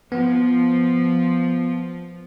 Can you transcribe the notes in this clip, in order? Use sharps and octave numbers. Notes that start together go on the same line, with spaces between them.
F3 B3